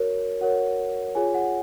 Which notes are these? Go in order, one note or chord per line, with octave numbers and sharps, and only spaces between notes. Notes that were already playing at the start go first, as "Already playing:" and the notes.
Already playing: F#4 A#4 C#5
F#4 A#4 C#5 F#5
F4 G#4 C#5 G#5
F#5